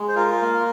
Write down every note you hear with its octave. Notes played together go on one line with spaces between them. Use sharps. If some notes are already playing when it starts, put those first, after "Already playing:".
Already playing: G#3
C5
F4 A#4
A#3